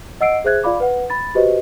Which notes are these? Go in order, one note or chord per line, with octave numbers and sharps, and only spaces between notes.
D#5 F#5 E6 C7 D7
G#4 C5 E5 F#6 G#6
F4 D5 F5 B5 D6
B4 F#5
B5 A6
F#4 G4 B4 C5 D#5